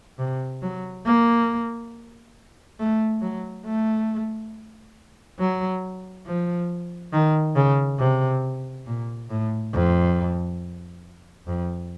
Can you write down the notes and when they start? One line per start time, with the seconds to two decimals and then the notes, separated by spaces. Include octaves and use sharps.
0.18 C3
0.62 F#3
1.06 A#3
2.79 A3
3.22 F#3
3.66 A3
5.39 F#3
6.26 F3
7.13 D#3
7.56 C#3
7.99 C3
8.87 A#2
9.30 A2
9.72 F2
11.47 F2